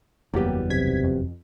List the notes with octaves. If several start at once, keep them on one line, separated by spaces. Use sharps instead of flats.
F#1 E2 F#3 G3 A#3 B3 G4
B1 C3 G#6 B6
F2